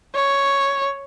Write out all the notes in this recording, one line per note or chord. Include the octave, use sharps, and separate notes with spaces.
C#5